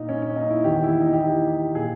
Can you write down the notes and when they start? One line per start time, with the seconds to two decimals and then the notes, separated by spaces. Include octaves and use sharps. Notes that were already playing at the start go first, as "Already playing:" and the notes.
Already playing: A#2 D#4
0.09 C#4
0.22 C#4
0.36 D#4
0.50 E4
0.64 E2 D#3 G4
0.83 E4
1.01 D#4
1.13 G4
1.20 E4
1.47 G4
1.75 A#2 G#4